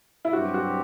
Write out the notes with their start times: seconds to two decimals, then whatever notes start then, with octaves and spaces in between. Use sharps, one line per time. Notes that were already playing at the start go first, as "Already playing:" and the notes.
0.25 E4
0.32 G2 F#3 C4 F#4 G4
0.54 F#4